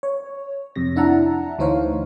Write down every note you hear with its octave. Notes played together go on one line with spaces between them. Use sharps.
C#5
F2 C3 A#6
D4 E4 E5 F#5 A5 A#5
D2 E3 D#4 C5 C#5 F5